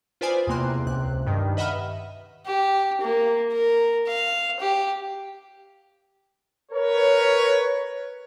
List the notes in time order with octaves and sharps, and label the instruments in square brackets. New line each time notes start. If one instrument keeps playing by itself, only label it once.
[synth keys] F4 B4 C5 D5 G#5 D#6
E2 C3 A#3 C6 F#6
C#2 C3 F#6
G2 D#3
B4 D#5 E5 F#5 B5 F6
[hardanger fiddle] G4
A#3
A#4
F5
G4
[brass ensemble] A#4 B4 C#5